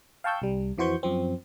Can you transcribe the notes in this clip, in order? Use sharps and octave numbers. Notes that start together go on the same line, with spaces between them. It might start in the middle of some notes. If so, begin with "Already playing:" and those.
F5 G5 A5 C#6 E6 G6
C2 G3
F2 E3 F#4 C5 C#6 G6
F#2 F3 C4